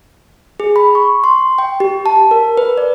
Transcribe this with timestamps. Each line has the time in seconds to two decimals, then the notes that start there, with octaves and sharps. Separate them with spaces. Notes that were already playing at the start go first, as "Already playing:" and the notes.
0.60 G#4
0.76 B5
0.95 C#6
1.24 C6
1.58 G5
1.80 G4
2.06 A5
2.31 A#4
2.57 B4
2.78 D5